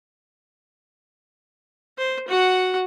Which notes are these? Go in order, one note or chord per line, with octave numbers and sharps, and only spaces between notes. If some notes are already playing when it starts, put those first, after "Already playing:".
C5
F#4 F#5